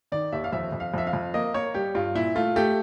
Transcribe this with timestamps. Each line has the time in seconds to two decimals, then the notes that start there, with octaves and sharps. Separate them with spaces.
0.12 D#3 D5
0.32 D#2 E5
0.44 F5
0.53 F2 E5
0.72 F2
0.80 F5
0.94 F2 E5
1.07 F5
1.13 F2
1.34 A#3 D#5
1.54 A#3 C#5
1.74 G3 G4
1.95 G2 F4
2.15 A#2 E4
2.35 A3 F4
2.56 A3 G4